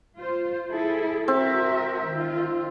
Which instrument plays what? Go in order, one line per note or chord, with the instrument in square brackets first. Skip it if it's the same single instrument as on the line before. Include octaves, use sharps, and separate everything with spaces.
[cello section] F4 C5
E4 G#4 A4
[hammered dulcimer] C4 [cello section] F#4 A#4 E5
[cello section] D#3 F4